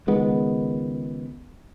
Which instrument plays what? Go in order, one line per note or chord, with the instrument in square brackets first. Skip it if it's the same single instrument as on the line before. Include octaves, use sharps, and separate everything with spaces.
[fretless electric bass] C#2 D#3 G#3 B3